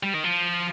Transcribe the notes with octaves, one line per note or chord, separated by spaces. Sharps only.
G3
D#3
F3